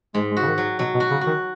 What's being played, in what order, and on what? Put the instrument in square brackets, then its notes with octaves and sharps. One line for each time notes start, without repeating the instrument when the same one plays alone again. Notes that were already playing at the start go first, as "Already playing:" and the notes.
[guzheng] G#2 [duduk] G#3
[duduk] G#3
[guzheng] F#4
[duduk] C#3
D#3
[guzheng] F#3
[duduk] B2 [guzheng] F#3
[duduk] B2
[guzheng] F#4
[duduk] C#3
[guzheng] F#4
[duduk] D#3